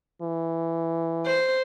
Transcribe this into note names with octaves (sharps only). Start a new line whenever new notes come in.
E3
C5